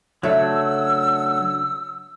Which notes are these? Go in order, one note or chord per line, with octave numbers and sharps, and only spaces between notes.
C#3 F#3 A3 D4 A4 E5 E6